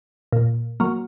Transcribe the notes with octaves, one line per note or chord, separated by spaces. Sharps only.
A#2
F#3 A#3